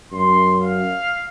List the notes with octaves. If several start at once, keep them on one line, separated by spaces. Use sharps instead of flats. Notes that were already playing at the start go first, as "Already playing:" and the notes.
F#2 C6
F5